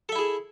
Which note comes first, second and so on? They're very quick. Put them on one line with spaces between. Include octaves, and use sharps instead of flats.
A4 E5 E4 G#4